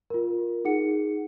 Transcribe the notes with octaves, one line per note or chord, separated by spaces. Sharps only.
F4 A#4
D#4 G#4 F#5 C#7